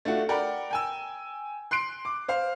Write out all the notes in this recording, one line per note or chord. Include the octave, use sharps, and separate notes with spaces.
A3 D4 F4 F#4
A#4 D5 F#5 G5 A#5 B5
G5 G#5 E6
C6 F#6 C7 D7
D6
C5 F5